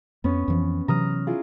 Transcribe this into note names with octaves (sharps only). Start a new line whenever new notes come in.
F2 B3 C#4
F2 E3 F3
C3 E3 F#3 A#5 D#6 F6
E4 F4 G#4